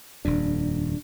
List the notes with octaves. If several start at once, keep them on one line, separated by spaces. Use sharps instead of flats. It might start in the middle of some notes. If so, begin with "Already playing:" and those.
D#1 F2 D4